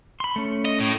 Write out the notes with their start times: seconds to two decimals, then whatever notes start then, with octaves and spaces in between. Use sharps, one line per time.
0.20 B5 C6
0.36 A3 C#4
0.65 D#5
0.80 A2